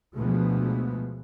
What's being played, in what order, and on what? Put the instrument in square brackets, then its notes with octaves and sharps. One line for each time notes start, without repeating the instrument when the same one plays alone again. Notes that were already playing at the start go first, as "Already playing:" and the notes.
[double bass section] D2 B2 F3 G#3 A3 B3